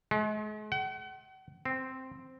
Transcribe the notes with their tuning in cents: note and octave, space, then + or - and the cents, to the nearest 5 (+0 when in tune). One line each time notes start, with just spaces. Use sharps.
G#3 +40
F#5 +40
C4 +0